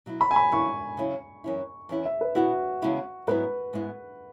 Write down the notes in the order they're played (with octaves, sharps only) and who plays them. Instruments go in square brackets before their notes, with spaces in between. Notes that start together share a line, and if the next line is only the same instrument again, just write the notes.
[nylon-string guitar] B2 F#3 E4
[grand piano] B5
G#5
B5
[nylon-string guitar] F#2 C#3 E3 B3 E4 [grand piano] C#6
[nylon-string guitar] C#3 F#3 C#4 E4
F#2 E3 C#4 E4
E2 E3 C#4 E4
[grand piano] E5
B4
[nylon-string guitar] B2 B3 E4 [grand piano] F#4
[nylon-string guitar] E2 C#3 G#3 B3 E4
[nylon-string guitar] G#2 F#3 B3 E4 [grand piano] B4
[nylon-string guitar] G#2 G#3 B3 E4